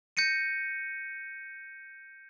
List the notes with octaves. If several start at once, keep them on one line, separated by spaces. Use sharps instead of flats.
G6 A#6 C#7 D#7